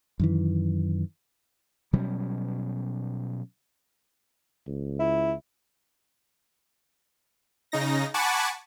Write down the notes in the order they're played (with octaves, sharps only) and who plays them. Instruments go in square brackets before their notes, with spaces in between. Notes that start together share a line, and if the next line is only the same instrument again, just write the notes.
[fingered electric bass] F#2 D#3 E3
[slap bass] B2 F#3 G3 C#4
[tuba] C#2
[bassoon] E4
[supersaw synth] C#3 D#4 A#6
F#5 G#5 A5 B5 C#6 D6